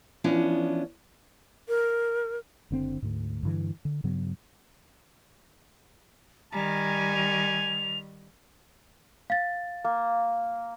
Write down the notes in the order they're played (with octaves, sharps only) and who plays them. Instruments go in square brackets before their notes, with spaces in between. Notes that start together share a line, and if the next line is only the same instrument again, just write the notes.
[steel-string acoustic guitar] E3 F3 B3 C#4 D4
[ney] A#4
[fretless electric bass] F#1 D3 C4
D2 G#2
G2 D3 E3
D3
G2 C#3 F#3 B3
[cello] D#3 G3 [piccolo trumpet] G#5 [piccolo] A#5
[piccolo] F7
[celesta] F5 A6
[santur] A#3